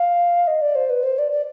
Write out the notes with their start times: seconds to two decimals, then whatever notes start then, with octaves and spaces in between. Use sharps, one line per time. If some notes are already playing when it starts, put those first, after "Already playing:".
Already playing: F5
0.47 D#5
0.61 D5
0.75 C5
0.90 B4
1.03 C5
1.18 D5
1.32 D5